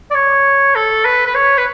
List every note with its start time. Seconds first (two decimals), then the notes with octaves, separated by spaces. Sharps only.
0.11 D5
0.15 C#5
0.76 A4
1.05 B4
1.26 B4
1.35 C#5
1.57 B4